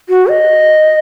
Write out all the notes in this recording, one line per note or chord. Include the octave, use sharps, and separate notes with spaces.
F#4
D#5